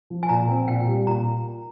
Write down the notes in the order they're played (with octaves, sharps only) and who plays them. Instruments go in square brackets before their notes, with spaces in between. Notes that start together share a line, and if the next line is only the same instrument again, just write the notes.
[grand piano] F3
[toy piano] G#5
[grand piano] A#2 [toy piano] A#5
[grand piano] C4
[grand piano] A#2 [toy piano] G5
[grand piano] G3
[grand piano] A#2 [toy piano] A#5